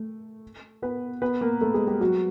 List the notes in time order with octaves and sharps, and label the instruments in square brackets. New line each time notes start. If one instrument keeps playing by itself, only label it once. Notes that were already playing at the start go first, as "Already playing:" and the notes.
Already playing: [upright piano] A3
B3 B4
B3 B4
A#3 A#4
A3 A4
G#3 G#4
G3 G4
F#3 F#4